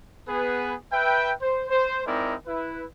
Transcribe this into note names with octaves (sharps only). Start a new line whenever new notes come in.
B3 G#4 B4
B4 E5 G5
C5
C5
G#3 C4 D#4 E4 A#4 D5
E4 B4